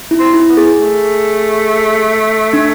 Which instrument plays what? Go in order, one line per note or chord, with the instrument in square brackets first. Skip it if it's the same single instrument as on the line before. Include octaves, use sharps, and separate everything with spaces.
[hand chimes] E4
[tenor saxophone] C4
[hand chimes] E4
[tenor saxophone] B3
[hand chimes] G#4
[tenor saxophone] A3
[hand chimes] D4